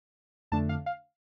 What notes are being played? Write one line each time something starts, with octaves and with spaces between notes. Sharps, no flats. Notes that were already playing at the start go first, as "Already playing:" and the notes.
F2 D3 A3 D4 A5
F5
F5